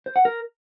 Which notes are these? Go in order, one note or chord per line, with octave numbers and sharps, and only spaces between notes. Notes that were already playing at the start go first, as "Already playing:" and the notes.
C5
F#5
A#4